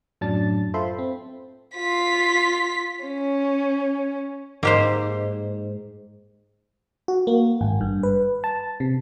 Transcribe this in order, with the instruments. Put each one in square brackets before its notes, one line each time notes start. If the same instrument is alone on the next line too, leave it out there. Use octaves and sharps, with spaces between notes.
[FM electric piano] F#2 A2 F#3 D4 A5 A6
F4 A4 C5 E5 B5 C6
C4
[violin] F4 B6
C#4
[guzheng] G#2 [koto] A#3 G4 C5
[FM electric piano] F#4
A#3
G#1
G2
B4
A5
C3